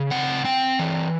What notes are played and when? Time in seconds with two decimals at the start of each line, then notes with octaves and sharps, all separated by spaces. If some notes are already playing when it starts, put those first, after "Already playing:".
Already playing: C#3
0.11 C4 F#5
0.44 C4 G5
0.79 E3